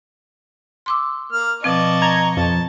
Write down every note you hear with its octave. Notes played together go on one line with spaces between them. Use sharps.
C6 D6 E6
A#3 F6
B2 F3 C4 D5 D#5 A5 C#6
A#5 G#6
F2 A5